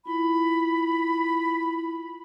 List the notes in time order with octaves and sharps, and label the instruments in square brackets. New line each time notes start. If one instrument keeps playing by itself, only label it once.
[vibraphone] E4 F4 [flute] B5